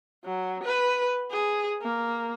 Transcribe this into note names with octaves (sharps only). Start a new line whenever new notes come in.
F#3
B4
G#4
A#3